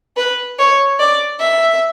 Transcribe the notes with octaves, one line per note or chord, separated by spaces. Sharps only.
B4
C#5
D5
E5